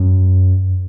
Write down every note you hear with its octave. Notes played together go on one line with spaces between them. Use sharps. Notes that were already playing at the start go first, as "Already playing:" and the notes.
Already playing: F#2